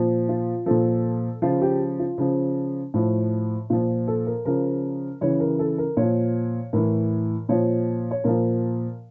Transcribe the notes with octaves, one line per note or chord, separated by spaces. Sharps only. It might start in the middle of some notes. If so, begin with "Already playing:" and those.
Already playing: A#2 F3
F4
A#2 F3 A4
C#3 F3 F4
G4
F4
C#3 F3
A2 F3
A#2 F3 F4
A4
A#4
C#3 F3 A#4
C#3 E3 C#5
A#4
A4
A#4
A#2 F3 C#5
A2 E3 A#4
A#2 F3 C#5
C#5
A#2 F3 A#4